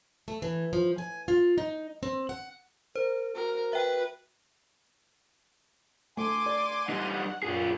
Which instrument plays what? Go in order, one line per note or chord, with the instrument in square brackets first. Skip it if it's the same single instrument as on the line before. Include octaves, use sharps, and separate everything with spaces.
[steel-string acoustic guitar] A3
E3
F3
G#5
F4
D#4
C4
F#5
[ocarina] A#4 [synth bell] C5
[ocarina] F#4 [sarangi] A#4
[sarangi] B4 [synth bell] E5 G5
[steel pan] A3 [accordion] G#5 C6 [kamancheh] D6
[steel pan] D5
[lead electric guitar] G3 D#4 [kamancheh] F#5
[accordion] F#2 A#2 [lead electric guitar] F4 G#4